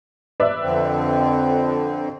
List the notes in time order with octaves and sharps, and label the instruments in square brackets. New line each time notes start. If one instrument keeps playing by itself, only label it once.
[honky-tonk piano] B4 D5 E5
[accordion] F2 D3 C4